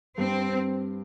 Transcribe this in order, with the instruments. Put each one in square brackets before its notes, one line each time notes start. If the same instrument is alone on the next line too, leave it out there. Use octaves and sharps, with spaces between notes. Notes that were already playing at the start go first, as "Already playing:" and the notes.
[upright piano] G2 [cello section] C4